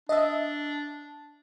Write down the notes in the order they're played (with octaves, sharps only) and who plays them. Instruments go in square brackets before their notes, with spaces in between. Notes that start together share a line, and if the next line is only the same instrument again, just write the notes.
[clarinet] D4 [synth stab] D#5 E5